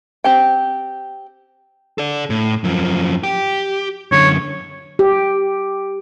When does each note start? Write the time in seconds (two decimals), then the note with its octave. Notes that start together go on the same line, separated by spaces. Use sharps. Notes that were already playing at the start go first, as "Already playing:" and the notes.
0.24 C4 G4 G5
1.98 A4 D5
2.30 A2
2.64 F#2 F3
3.23 G4
4.12 F#2 D3 C#5
4.99 G4